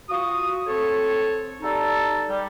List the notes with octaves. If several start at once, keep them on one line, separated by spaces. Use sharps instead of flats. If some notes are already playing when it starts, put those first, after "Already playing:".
F4 F#4 D#6
C4 A4 C#5
G3 D#4 A4
G3